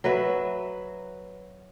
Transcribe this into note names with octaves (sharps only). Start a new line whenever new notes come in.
F#3 B4 E5